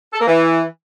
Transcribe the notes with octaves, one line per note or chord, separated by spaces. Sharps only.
A4
A#3
E3